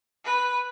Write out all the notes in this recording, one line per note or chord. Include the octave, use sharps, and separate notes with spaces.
B4